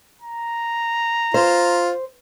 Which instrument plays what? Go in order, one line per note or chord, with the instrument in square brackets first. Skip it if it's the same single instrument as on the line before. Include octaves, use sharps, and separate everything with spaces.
[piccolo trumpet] A#5
[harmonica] F4 [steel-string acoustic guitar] C5